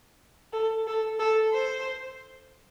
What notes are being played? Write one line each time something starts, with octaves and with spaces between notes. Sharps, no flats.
A4
A4
A4
C5